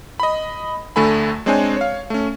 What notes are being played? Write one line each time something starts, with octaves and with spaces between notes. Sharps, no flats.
D#5 B5
D2 D3 A3 A4 G#5 B5
G#3 C4 D4 C5 C#5 G#5
C#5 F5
A3 C#4